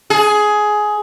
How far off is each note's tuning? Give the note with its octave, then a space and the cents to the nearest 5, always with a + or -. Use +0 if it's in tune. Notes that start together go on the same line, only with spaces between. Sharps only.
G#4 +15